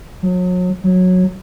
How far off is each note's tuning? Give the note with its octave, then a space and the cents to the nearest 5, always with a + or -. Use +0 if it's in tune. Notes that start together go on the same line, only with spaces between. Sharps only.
F#3 -35
F#3 -15